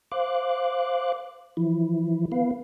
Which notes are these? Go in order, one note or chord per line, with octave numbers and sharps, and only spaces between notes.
C5 F5 D6 F#6
E3 F3 E4
B3 B4 F5